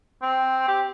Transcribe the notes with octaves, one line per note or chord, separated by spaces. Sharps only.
C4
G4